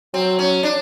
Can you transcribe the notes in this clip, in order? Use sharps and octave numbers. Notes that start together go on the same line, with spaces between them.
F#3 C4
C#4
D4